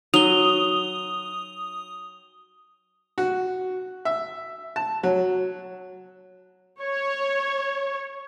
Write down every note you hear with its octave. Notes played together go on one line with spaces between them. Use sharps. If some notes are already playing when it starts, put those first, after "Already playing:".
F#3 D#4 D#6 F7 G7
F#4
E5
A5
F#3
C#5